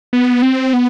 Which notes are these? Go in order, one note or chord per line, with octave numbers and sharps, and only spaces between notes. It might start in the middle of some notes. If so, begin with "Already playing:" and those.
B3
C4
B3